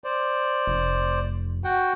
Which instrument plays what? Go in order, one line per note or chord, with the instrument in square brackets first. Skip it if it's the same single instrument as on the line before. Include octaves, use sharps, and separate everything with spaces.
[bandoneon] C5 D5
[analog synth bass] F1
[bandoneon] F#4 F#5 G5